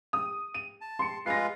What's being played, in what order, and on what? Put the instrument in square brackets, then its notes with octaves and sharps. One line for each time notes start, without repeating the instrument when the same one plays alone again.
[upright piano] D#6
D#7
[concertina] A5
[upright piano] C6 C#7
[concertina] G#3 F4 B4 [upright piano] A#6 C7